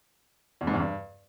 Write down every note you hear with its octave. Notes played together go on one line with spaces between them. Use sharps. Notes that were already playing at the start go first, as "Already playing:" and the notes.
E2
G#2
E2
G2